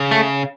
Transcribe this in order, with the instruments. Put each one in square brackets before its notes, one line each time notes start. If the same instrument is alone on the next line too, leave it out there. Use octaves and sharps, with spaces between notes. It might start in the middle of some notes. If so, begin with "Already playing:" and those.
Already playing: [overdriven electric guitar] C#3
[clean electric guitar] A3